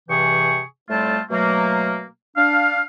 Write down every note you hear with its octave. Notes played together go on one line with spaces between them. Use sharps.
G2 C3 E3 G#4 G5 C#6
A2 G3 A3 C4 F4 A5
B2 F#3 A3 A#3
D4 F5